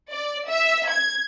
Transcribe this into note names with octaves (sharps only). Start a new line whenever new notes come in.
D5
E5
G#6